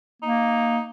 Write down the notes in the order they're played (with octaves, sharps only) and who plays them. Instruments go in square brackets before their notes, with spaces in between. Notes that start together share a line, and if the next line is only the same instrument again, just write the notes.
[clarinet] A#3 [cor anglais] D#4